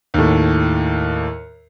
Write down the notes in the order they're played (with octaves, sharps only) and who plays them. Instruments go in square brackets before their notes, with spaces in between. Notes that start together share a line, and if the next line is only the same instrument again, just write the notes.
[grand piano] D#2 A2